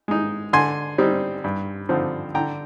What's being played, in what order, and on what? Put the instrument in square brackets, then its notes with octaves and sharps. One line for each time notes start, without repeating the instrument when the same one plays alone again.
[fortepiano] G#3 D#4
D3 G#5 C6
G3 C4 D#4
G2
D3 F3 C4 D#4
D3 G5 A#5